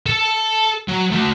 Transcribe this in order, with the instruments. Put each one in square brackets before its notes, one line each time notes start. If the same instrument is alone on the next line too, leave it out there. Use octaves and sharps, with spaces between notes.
[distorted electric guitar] A4 A5
F#3
A3 F#4